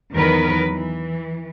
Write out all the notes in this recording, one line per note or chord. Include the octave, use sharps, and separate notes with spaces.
E2 D#3 F#3 B3 A#4 B4
E3